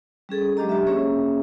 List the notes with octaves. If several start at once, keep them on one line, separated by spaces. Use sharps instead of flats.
G3 C#4 G#4 A4
F#3 G#3 D4 G4 D#5 A#5
G4 E5
A#3 C#4 G#4 C#5 E5